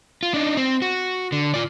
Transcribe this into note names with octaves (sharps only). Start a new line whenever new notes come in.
F4
D4 D#4
C4
F#4
D3
F4 D5